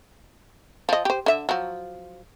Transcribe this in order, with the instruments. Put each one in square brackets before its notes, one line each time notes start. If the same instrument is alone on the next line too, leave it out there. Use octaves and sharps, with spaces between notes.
[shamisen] F3 D#5
G4 C5
D3 E5
F3 F#3